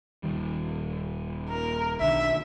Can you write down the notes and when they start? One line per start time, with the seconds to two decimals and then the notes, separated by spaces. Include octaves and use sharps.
0.23 D#1 D#3 G3
1.49 A#4
2.00 B1 D3 D#3 E5